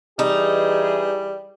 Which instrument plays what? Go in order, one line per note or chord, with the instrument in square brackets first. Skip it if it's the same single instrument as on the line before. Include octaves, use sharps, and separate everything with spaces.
[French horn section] E3 G#4 [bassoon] G3 [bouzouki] D#4